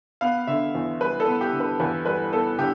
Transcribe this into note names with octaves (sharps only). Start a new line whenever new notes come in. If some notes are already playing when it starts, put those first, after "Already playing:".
B3 F5
D3 E5
E2
G3 B4
A4
B3
G4
D3
B4
E2 B4
G3 B4
B3 A4
D3 G4